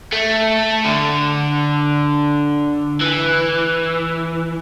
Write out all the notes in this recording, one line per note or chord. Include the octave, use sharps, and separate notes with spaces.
A3
D3
E3